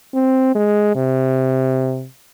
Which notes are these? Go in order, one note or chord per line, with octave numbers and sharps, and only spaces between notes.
C4
G#3
C3